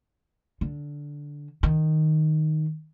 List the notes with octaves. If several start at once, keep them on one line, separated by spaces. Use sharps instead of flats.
D3
D#3